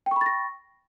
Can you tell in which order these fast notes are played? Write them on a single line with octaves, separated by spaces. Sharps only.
G5 C#6 B5 A6 A#6